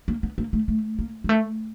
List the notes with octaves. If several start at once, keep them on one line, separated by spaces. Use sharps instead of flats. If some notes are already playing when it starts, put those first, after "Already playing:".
A#3
B3
A#3
A3
A3
A#3
G#3
A3